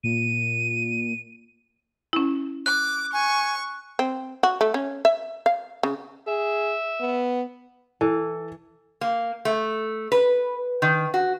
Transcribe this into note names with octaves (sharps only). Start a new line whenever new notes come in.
A#2 D#7
C#4 E4
D6 F#6
G#5 C#6
C4
F#4
A3
C#4
E5
F5
C#3
G#4 E5
B3
E3 A4
A#3
A3
B4
D#3
F#4